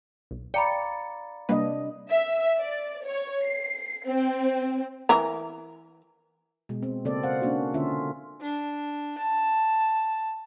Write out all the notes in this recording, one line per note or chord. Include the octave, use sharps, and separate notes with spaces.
B1
D5 F5 G5 A#5 B5 C#7
C3 G3 A#3 D4 B4 D#5
E5
D5
C#5
C7
C4
E3 A#4 A#5
B2 G#3
C4
C#3 A#3 C4 A4 D5
C5 F5 F#5
A#3 C#4 D4 F#4
D3 C#4 F4 E5
D4
A5